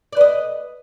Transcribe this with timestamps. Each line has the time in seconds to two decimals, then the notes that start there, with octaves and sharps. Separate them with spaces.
0.12 D5
0.17 B4
0.21 D#5